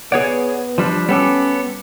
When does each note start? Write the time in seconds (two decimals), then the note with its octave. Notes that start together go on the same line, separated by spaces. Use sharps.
0.12 B3 G#4 C#5 D5 F#5
0.78 F3 G3 D4
1.09 G3 B3 C#4 A4 G5 D6